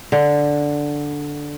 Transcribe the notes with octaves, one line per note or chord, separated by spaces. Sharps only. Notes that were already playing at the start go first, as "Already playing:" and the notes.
D3